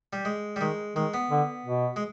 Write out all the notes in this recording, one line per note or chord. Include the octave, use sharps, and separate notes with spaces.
G3
G#3
G3
D#3 G#3
D#3 G#3
B3
D3
B2
G#3